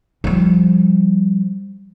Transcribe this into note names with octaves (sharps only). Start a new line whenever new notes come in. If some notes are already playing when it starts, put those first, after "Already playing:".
F3 G3